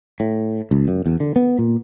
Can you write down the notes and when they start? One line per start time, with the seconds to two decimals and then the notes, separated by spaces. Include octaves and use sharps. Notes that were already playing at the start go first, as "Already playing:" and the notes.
0.20 A2
0.71 C#2
0.88 F#2
1.06 E2
1.20 D3
1.36 B3
1.59 A#2